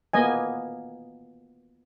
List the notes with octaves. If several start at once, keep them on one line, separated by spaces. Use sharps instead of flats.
A#3 B3 D#5 G#5